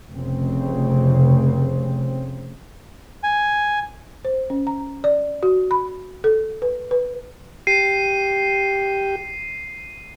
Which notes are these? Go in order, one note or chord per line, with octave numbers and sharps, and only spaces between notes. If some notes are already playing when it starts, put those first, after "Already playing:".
F1 C#3 C4
G#5
C5
C#4
A#5
D5
F#4
B5
A4
B4
B4
G4 C7 D#7